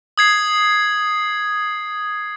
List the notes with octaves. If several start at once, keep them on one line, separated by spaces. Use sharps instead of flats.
D#6 G#6 C7